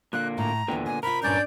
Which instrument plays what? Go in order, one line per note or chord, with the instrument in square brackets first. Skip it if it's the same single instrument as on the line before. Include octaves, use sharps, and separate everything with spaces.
[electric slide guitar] A#2 D3 A#3 [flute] F#6
[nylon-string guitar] A2 [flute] A#5
[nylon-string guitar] D#2 E3 G5 [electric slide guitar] A#2 D3 B3
[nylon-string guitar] D#5 [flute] G#5
[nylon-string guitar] C3 F4 [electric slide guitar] A#4 [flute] B5
[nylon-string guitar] E2 G2 A#2 [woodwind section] C#4 D4 D5 [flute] G6